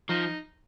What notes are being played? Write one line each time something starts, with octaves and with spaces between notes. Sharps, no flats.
F3 D#4